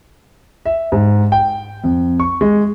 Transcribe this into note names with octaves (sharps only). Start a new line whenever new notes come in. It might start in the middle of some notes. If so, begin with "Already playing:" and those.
E5
G#2
G5
F2
C#6
G#3